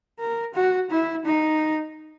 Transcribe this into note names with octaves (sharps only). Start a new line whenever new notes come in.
A#4
F#4
E4
D#4